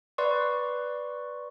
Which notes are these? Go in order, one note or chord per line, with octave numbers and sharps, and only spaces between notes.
B4 D5 C6 C#6